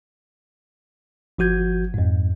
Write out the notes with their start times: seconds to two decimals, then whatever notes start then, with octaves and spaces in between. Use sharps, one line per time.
1.38 G1 F3 F#4 G6 G#6
1.94 F2 G#2